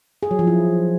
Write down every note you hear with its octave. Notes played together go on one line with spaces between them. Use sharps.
G#4
F#3
F3
E4